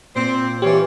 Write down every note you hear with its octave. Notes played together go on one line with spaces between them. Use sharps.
A#2 C4
E3 G3 F4 G4 C#5